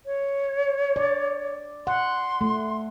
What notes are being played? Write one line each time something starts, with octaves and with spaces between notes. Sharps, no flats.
C#5
D5
F#5 C6
A3